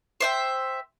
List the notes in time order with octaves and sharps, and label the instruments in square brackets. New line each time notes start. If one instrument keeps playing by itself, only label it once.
[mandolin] C5 E5 G5